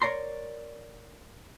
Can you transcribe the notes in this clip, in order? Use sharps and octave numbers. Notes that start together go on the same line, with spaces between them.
A#4 C#5 D5 A#5 C6